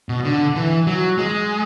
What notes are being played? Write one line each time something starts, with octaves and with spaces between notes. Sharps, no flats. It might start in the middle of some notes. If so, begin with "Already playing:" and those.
B2
D3
E3
F#3
G#3